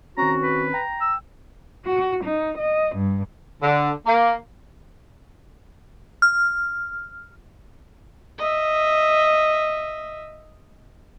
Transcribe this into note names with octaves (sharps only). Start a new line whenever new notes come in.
D#3 C4 C#4 F#4 A#5
B4
G5 A#5
E6
F#4
D#4
D#5
G2
D3
A#3
F6
D#5 E5